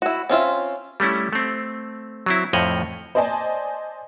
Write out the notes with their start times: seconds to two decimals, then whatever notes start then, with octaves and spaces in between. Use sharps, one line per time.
0.02 E4 F#4
0.30 C4 C#4 F4 E5
1.00 G3 A3 C#4 E4
1.33 A3 C4
2.26 F#3 C4 E4
2.53 F2 A2 F3 C#5 D#5 F#5
3.15 C5 D5 D#5 G#5 A5